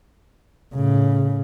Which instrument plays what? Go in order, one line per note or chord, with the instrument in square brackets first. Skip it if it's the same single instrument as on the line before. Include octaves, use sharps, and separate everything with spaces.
[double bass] A2 C#3